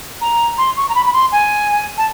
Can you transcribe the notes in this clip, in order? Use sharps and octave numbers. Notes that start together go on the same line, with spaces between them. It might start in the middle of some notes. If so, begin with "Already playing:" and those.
A#5
C6
C#6
A#5
B5
B5
C6
G#5
A5